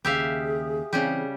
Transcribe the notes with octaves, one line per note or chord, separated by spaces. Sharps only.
D#2 C#3 G4 G#4 E5 F5
C#3 E3 G3 C4 G4